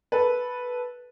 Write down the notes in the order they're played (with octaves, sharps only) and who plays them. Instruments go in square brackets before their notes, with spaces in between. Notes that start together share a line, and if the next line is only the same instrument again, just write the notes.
[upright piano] A4 B4